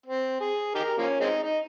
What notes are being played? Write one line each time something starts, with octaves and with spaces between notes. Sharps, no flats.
C4
G#4
D#4 G4 A#4
F3 A#3 C#4
G#3 C4 D#4
D#4